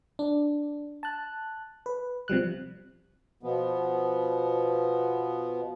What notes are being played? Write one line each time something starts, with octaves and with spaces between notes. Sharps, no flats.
D4
A5 F#6
B4
C3 F3 G3 F#6
B2 F3 B3